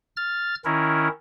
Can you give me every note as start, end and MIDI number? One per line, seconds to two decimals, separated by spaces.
0.17 0.55 89
0.17 0.55 93
0.65 1.08 51
0.65 1.08 61
0.65 1.08 64
0.65 1.08 70